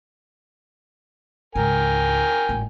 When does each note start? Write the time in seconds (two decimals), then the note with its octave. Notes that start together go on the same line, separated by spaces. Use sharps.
1.55 C#2 G#2 A#4 G5 G#5
2.49 G#1 A2